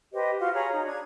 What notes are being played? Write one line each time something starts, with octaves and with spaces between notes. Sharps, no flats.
G4 B4 C5 D#5
F4 F#4 F5 C6
G#4 C#5 A#5 B5
D#4
D4 G#6